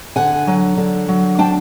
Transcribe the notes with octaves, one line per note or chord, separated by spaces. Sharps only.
D3 F#5 G#5
F#3
D3
F#3
D4 G5 A5